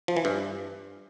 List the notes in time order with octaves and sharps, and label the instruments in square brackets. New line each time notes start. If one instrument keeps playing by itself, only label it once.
[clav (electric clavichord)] F3
E3
G2